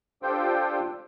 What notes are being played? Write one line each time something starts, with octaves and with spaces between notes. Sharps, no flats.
D4 F4 G4 A4 C5 G5